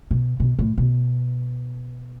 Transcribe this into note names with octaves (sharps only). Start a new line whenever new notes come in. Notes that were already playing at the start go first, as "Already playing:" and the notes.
B2
B2
A2
B2